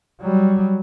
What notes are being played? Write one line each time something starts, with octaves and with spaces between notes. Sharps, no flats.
F#3 G3